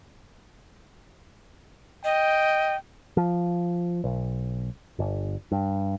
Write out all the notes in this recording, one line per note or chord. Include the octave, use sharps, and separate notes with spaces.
D#5 G5
F3
B1
G1
G2